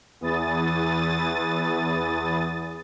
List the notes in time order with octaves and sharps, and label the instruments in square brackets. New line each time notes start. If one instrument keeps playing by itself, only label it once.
[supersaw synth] E2 E3 D#6 A6